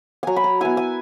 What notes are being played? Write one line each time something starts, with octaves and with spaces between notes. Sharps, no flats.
F#3 G#5 A#5
B5
A#5
B3 E4 G#5
G#5